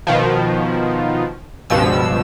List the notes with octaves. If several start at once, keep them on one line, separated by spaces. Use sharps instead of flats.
B2 D#3 F3
C#2 G2 B2 F3 E6